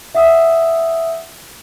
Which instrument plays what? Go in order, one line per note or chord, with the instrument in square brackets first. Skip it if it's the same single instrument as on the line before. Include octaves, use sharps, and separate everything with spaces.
[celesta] E5 F#5 D#6 E6